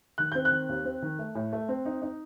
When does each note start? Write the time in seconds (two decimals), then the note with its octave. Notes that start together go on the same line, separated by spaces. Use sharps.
0.18 D#3 F#6
0.32 C4 G6
0.45 F#6
0.51 D#3
0.69 D#2
0.85 C4
1.02 D#3
1.19 A3
1.35 A2
1.53 A3
1.69 C4
1.85 D#4
2.02 D#4